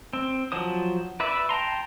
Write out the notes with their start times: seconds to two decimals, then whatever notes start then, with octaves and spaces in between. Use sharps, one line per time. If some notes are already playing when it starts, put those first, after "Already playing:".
0.13 C4
0.52 F3 F#3 C5 D#6
1.20 B4 D5 E5 B5
1.49 G5 A5 A#5 C6